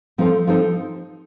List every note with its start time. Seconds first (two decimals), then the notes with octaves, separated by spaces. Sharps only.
0.18 F3 C4 D#4 A4 C5
0.47 F3 C4 D#4 A4 C5